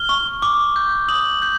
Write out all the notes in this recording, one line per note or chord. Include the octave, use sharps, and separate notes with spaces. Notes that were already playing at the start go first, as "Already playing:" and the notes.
Already playing: F6 G7
C#6
D6
G6
D#6 F#7
G6